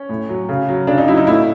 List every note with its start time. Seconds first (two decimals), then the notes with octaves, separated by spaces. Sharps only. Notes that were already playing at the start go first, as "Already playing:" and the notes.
Already playing: C#4
0.09 A2
0.29 F#3
0.49 C#3
0.69 F#3
0.87 C#3 D4
0.98 D#4
1.08 F#3 E4
1.17 D#4
1.27 A2 E4